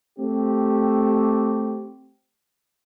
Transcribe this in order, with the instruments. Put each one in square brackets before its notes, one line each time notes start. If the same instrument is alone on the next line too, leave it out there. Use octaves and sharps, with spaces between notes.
[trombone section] A3 C4 G4